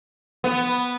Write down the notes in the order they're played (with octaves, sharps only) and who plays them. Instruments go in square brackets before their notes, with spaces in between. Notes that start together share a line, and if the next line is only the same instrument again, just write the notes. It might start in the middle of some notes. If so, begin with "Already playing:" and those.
[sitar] B3